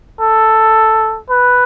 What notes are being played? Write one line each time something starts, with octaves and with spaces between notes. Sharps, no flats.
A4
B4